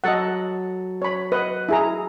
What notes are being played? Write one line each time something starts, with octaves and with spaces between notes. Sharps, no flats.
F#3 A4 D#5 F#5 A5
C#5 B5
B4 D#5 F#5
E4 G#4 A#5